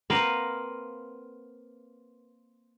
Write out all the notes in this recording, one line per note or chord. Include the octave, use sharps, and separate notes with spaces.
A#3 C4 A#4 B4 F5 F#5